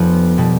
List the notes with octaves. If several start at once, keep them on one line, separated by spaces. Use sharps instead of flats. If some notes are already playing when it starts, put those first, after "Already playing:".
Already playing: F1 F2 B3
B2 G3